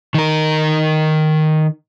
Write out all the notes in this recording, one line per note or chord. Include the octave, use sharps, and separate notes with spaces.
D#3 A#4